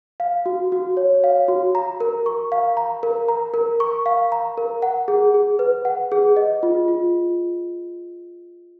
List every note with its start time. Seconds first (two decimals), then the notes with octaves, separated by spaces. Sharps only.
0.20 F5
0.46 F#4
0.72 F#4
0.97 C#5
1.24 F5
1.48 F#4
1.75 A#5
2.00 A#4
2.26 C#6
2.52 F5
2.77 A#5
3.03 A#4
3.28 A#5
3.54 A#4
3.80 C#6
4.06 F5
4.32 A#5
4.58 A#4
4.82 F#5
5.08 G#4
5.34 G#4
5.59 B4
5.85 F#5
6.12 G#4
6.37 D#5
6.63 F4
6.88 F4